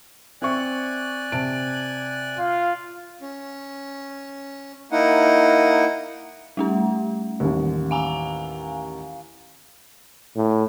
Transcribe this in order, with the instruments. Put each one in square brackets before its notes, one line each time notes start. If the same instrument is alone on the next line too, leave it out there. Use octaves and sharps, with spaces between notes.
[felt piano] C4 E5 C#6 [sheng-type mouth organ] D5 G#5 F#6
[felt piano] C3 A5 D7
[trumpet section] F4 F5
[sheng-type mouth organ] C#4
A#3 D#4 E4 F#5
[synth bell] G3 A3 C#4
[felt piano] A1 D#2
[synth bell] F5 G#5 A#5
[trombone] A2